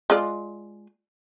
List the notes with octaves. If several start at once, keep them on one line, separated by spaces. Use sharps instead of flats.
G#3 F4 D5